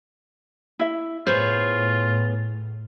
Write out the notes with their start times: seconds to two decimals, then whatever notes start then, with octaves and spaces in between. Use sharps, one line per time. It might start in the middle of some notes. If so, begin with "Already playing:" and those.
0.79 E4 E5
1.27 A2 B3 F4 G#4 C5 C#5